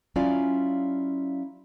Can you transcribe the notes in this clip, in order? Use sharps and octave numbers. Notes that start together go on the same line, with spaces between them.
F#3 C#4 E4 F4 D5 F5